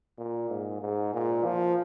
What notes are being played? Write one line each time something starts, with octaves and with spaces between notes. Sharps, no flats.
A#2
G#2
G#2
A#2
F3